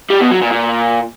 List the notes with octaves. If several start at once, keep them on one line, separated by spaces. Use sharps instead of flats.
G3
B2
F#3
A#2
A#2